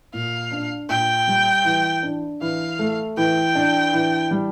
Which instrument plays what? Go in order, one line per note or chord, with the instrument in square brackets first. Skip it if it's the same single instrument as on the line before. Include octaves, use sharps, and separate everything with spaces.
[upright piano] A#2 [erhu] F5
[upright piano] D4
[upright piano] A#2 [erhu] G5
[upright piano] G3
E3
D4
[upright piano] E3 [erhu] F5
[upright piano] A3
[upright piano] E3 [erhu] G5
[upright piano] D4
E3
G3